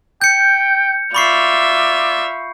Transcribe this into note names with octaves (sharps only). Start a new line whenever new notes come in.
G5 G6 C#7
F4 D5 E5 B5 C#6 C7